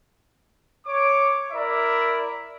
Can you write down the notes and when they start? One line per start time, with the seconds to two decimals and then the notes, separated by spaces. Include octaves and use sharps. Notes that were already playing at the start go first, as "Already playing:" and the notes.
0.86 C#5 D6
1.52 E4 A#4 D5 E5